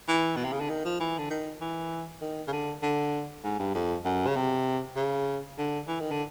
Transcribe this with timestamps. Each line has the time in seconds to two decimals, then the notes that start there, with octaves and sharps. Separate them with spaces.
0.08 E3
0.36 B2
0.44 C3
0.53 C#3
0.60 D3
0.69 D#3
0.85 F3
1.00 E3
1.18 D3
1.30 D#3
1.61 E3
2.21 D#3
2.48 C#3
2.53 D3
2.83 D3
3.44 G#2
3.59 G2
3.75 F2
4.05 F#2
4.27 C#3
4.36 C3
4.96 C#3
5.58 D3
5.88 E3
6.00 D#3
6.11 D3